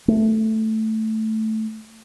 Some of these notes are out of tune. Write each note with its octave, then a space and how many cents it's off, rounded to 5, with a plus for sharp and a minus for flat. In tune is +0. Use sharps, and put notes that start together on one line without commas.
A3 +0